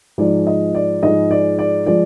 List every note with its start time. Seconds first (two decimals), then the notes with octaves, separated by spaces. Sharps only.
0.18 G#2 F3 G#3 D5
0.47 D#5
0.75 D5
1.03 G#2 F3 G#3 D#5
1.31 D5
1.59 D5
1.86 F3 G#3 D5